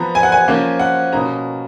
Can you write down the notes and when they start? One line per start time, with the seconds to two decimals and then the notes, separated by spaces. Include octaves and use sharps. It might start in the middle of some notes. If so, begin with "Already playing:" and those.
Already playing: F3 B3 A#5
0.15 G#5
0.23 F#5
0.32 G#5
0.48 F3 A#3 C#4
0.79 F#5
1.13 B2 A#3 C#4 A#5